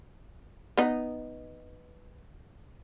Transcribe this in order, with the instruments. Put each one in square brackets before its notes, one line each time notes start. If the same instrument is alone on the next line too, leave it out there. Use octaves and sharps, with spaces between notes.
[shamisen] B3 D#4